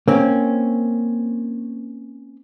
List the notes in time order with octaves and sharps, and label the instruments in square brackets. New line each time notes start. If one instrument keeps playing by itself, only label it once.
[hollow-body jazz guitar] A#3 C4 C#4